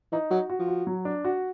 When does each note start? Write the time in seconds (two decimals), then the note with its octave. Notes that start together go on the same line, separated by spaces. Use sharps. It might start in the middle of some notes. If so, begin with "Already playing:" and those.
0.12 E3 D#4
0.30 F#3 F#4
0.50 F#4
0.59 F3
0.68 F#4
0.87 F#3
1.05 D4
1.25 F#4